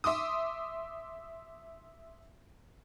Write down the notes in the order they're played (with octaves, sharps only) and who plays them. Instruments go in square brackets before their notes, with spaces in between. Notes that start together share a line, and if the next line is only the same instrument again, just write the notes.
[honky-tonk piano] E5 C6 D6 D#6